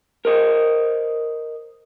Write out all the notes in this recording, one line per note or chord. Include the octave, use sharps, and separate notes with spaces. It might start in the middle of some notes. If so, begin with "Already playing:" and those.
A#4 C5 D#5